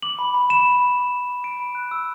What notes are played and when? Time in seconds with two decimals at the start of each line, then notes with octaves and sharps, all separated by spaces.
0.02 D6 F#7
0.19 B5
0.34 B5
0.50 B5 E7
0.66 B5
0.82 B5
0.97 D6
1.13 D6
1.29 D6
1.44 D6 D7
1.60 B5
1.75 F#6
1.91 E6